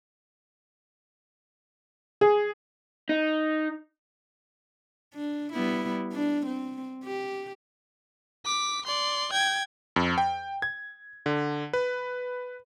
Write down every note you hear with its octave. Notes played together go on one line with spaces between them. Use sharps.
G#4
D#4
D4
G3 B3 E4
D4
C4
G4
D6 B6
D5 C6
G5 G#6
F2
G5
G#6
D3
B4